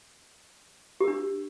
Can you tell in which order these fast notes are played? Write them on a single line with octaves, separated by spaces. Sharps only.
G4 A#4 D4